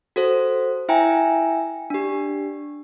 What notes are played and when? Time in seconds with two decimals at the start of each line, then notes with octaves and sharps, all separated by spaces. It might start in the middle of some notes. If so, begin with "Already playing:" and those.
0.16 F#4 A4 C5
0.89 E4 E5 G5 G#5 A#5
1.90 D4 G4